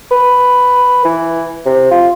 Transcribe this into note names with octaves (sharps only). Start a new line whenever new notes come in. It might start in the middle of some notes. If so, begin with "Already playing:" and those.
B4
E3
C3
F4